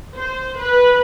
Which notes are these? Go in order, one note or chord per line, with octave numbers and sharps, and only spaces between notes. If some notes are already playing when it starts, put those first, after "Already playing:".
C5
B4